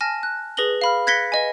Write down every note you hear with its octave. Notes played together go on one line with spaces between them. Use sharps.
G#5 A5 F6 A#6
F#6
G#4 B4 D#6 A#6 F#7 G7
F5 B5 F6
F#6 G#6 A#6 B6 C#7 G7
B4 D#5 G#5